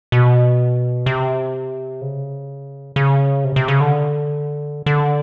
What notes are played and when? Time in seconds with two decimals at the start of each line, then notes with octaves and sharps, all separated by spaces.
0.12 B2
1.06 C3
2.01 C#3
2.96 C#3
3.44 C3
3.56 C3
3.68 C#3
3.80 D3
4.86 D3